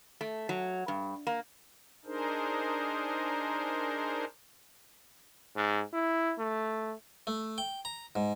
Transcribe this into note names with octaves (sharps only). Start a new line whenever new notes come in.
A3
F#3
G2
A#3
D4 D#4 G#4 A#4 C5
G#2
E4
A3
A3
G5
A#5
G#2